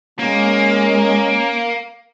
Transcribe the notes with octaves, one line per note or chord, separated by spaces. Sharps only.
G#3 A#3 C#4